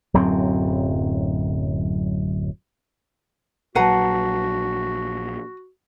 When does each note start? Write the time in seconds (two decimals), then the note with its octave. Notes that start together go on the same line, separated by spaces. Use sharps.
0.14 D1 F#2 F#3 C4
3.75 A#1 F#3 F#4 B4 F#5 A5 A#5 C7